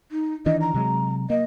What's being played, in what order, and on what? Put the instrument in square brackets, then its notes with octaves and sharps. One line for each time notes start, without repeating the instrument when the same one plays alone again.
[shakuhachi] D#4
[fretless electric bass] D#3 E3 D4 [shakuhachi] D#5
[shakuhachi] A#5
[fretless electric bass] C3 F#3 G#3
[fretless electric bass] A#3 [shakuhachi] D#5